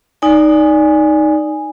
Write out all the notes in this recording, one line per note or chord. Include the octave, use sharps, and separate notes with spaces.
D#4 D5 G#5